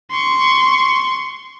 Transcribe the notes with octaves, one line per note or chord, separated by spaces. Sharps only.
C6 C#6